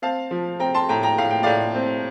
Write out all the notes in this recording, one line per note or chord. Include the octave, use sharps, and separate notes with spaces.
C4 F5 A5
F3
C4 G5 A#5
A5 C6
A2 G5 A#5
G5 A#5
A2 F5
G5
A2 D5 F5
C4